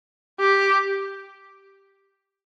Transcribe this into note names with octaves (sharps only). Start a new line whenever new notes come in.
G4